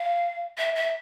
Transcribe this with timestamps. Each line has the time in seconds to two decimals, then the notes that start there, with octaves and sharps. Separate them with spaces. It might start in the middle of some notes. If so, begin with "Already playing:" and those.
Already playing: F5
0.57 E5
0.75 E5